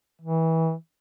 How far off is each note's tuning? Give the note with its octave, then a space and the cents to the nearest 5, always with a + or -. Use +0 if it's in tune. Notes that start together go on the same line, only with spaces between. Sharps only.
E3 -25